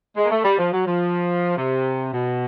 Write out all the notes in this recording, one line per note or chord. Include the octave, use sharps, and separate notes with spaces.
G#3
A#3
A3
G3
F3
F#3
F3
C3
B2